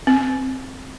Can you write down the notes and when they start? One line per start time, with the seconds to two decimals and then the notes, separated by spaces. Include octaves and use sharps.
0.07 C4